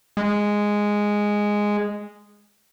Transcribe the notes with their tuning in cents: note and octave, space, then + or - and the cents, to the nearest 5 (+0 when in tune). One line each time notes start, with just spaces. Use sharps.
G#3 -5